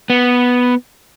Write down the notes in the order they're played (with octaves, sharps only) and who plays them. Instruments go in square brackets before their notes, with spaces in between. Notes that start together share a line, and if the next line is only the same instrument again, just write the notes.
[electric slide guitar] B3